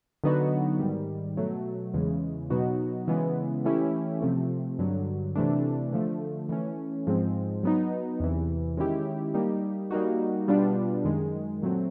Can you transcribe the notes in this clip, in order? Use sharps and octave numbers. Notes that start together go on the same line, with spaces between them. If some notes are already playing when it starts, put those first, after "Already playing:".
D3 F#3 B3 D#4 F#4
G#2 D#3 G3
B2 F#3 A3
E2 C#3 E3 G#3
B2 F#3 B3 D#4 F#4
C#3 E3 G#3 B3
E3 A3 C#4 E4 G4
C3 F3 A3 C4
G2 D3 F#3
C3 E3 A3 D4
D3 F3 A3
E3 A3 C#4
G#2 F3 G#3 C4
F#3 B3 D#4
E2 C3 E3
D#3 G#3 C#4 E4 G4
G3 A#3 D#4 G4
G3 A#3 D#4 F#4
B2 G3 B3 D4 F4
F#2 D#3 G#3
A#2 F#3 A3 C4